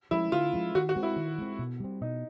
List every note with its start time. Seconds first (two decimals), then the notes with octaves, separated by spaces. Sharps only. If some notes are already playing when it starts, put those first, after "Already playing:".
0.11 F3 G#3 C#4 E4
0.32 D3 F4
0.53 F3 G#3 C#4
0.75 D#3 F#4
0.89 F#4
0.96 G#3 C4
1.03 E4
1.16 D#3
1.38 G#3 C4
1.59 B2
1.80 G3 C4
2.01 B2 D#4